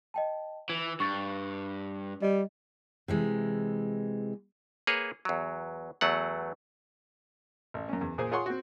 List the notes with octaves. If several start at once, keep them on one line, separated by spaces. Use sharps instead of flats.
D#5 G5 A5
E3 G#6
G2 C#6 A6
G3 D#5
C3 E3 G#3
A#3 G#4 B4 C#5
E2 F#3
E2 F#3 A3 F#5
A1
F#2 C#4
E2
A#2 G#4 C5
F4 G#4 C#5 F#5 C6 C#6
C4 F#4